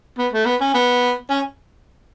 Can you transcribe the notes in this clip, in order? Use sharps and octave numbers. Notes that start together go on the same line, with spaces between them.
B3
A3
B3
C#4
B3
C#4